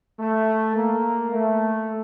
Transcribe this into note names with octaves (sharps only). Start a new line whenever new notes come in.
A3
A#3
A3